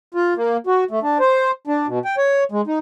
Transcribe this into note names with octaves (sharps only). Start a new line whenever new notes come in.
F4
A#3
F#4
A3
D4
C5
D4
B2
G5
C#5
G#3
D#4